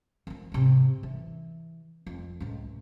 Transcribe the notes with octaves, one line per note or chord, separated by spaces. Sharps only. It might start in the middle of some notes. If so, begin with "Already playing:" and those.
D#3 F3
G#2 C3
E3
F2
C#2 A2